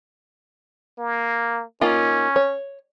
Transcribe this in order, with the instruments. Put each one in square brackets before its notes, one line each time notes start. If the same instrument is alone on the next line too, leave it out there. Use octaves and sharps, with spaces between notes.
[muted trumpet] A#3
[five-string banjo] A#3 D#4 F4 [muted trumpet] C#4
[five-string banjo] C#5